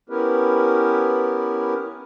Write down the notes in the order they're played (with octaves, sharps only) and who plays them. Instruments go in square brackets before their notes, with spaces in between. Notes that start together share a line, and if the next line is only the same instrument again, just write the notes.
[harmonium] B3 C#4 E4 G4 A#4 B4